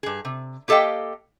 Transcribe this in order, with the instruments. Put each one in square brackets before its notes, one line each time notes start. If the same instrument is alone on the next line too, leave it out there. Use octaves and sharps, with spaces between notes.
[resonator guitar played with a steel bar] G2 G#4
C3
A#3 G4 A4 D#5 F5 G5